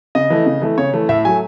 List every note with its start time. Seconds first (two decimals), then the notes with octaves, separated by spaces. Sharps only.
0.15 C#3 D#5
0.30 E3 A3
0.46 C#3
0.62 E3 A3
0.78 C#3 C#5
0.93 E3 A3
1.09 A2 E5
1.25 F#3 A3 G#5